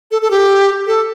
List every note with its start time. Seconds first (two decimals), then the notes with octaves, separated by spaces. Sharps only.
0.11 A4
0.22 A4
0.30 G4
0.87 A4